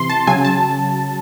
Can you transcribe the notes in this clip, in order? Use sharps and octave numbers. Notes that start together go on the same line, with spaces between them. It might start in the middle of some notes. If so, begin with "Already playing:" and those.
Already playing: C3 E3 C6
A5
C#3 F#3 G#5
A5